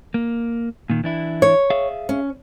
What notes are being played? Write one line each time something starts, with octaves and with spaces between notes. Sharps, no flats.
A#3
A#2 D#3
E3 D4 E4
C#5
G#4 E5 F5
C#4